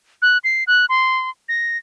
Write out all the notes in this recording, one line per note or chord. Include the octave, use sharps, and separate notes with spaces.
F#6
C7
F#6
C6
A#6